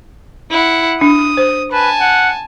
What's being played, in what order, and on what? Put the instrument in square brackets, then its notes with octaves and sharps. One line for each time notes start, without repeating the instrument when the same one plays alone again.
[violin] E4 F#5
[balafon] D4 [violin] D#6
[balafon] C5
[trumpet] B4 [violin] G#5 A5
[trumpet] F#5